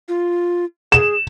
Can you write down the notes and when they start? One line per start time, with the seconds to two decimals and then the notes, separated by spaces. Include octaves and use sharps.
0.08 F4
0.92 G#4 E7